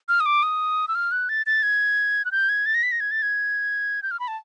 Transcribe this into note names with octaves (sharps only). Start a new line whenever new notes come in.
F6
D#6
D6
D#6
E6
F6
F#6
A6
A6
G#6
F#6
G6
G#6
A6
A#6
B6
A#6
G#6
A6
G#6
G6
F6
B5
A5